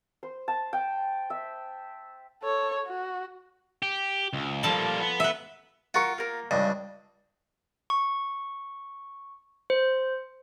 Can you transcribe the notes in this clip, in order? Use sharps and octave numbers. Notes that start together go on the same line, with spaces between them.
C5
A5
G5
E5
A4 C#5
F#4
G4
C#2
F3 G3 A#3 A4 A5
B3
B4 E5
F4 F#4 A#4 C#6
A#3 A#4
C#2 G2 D#5
C#6
C5